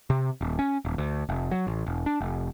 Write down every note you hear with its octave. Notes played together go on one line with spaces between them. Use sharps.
C3
D#1
C#4
D#1
D2
F1
F#3
A1
E1
D4
F1